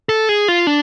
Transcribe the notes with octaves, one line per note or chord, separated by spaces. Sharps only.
A4
G#4
F4
D4